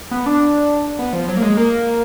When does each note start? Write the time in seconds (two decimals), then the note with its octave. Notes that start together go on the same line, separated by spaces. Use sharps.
0.11 B3
0.26 D4
0.99 B3
1.13 F3
1.28 F#3
1.37 A#3
1.42 G#3
1.57 A#3